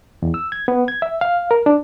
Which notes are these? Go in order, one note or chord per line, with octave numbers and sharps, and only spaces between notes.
E2
E6
G#6
B3
G#6
E5
F5
A#4
D4